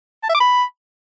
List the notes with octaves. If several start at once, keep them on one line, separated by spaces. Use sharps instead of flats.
A5
E5
D6
B5